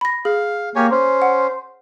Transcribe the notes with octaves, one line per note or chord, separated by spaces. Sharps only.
B5 A#6
G#4 F5
A#3 G4 C#5 G#5
C#4 C5
F#5